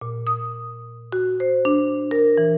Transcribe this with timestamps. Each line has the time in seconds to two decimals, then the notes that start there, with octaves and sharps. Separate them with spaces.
0.01 A#2
0.27 D#6
1.12 F#4
1.40 C5
1.65 D4
2.11 A#4
2.38 E3